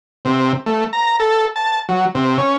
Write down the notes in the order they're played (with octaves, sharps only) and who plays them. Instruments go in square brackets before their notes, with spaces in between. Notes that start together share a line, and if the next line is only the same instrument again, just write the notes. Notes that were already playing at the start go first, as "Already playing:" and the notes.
[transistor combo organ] C3
A3
A#5
A4
A5
F#3
C3
C#4